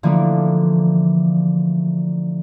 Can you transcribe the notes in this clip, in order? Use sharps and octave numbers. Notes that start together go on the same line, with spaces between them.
D3 E3 F3 A3 A#3 D4